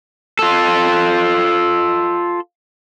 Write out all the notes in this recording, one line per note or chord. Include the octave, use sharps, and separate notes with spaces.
F4 A4